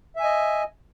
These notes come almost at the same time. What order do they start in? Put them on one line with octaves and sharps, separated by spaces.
E5 G#5 D#5